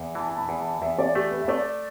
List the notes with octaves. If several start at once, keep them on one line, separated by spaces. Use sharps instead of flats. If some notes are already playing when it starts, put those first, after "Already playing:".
Already playing: E2
E3 A5
A5
B5
E2
A5
E2 E5
D5
A3 G4
B4
E5
A3 D5